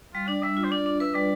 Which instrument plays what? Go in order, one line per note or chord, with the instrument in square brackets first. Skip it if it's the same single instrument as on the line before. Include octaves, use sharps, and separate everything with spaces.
[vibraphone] G3 [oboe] F4
[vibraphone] D4 [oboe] D5
[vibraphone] G3 [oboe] E5
[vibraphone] F4
[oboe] C5
[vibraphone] D4 [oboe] D5
[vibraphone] D4
[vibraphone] B4 [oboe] E5
[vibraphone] G3 [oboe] D5